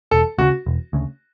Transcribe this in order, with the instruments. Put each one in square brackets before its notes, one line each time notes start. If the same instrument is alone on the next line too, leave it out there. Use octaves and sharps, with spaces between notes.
[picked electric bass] E1 [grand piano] A4
[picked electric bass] D2 C#3 [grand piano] F#4
[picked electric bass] E1
D2 C#3